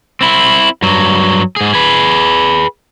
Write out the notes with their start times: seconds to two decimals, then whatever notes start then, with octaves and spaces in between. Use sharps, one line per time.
0.21 C4 E4
0.82 G2 F#3
1.56 G#2 G#4
1.74 G#4 B4